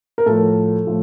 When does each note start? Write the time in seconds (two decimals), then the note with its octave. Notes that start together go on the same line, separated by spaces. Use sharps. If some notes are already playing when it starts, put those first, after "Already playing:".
0.18 A#4
0.26 A2 F3 A4
0.87 A2 F3